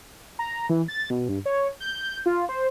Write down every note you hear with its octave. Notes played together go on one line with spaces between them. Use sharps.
A#5
E3
A6
B2
G2
C#5
G6
F4
C5